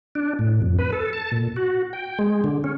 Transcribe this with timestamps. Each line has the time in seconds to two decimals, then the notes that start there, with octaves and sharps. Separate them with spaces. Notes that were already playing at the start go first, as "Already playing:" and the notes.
0.15 D4
0.39 A2
0.62 F2
0.79 B4
0.92 A4
1.13 A5
1.32 A#2
1.56 F#4
1.93 G5
2.19 G#3
2.44 D3
2.64 C#4